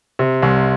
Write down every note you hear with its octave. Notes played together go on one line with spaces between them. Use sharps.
C3
C2